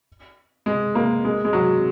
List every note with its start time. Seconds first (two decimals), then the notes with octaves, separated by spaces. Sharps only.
0.66 G#3
0.95 A#3
1.24 G#3
1.45 G#3
1.53 F#3